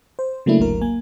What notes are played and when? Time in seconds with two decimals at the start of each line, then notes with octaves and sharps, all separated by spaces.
0.19 C5
0.46 C#3 F#3 A3 A#3 D4 E4
0.59 G#1 D2 F#3 A#4
0.82 A#3 G#5